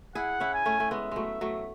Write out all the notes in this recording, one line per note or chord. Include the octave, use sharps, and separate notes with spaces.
E4 G#4 F#5
C#4 E4
G#5
A3 C#4
A3
G#3 B3 E5
F#3 G#3 A3
F#3 A3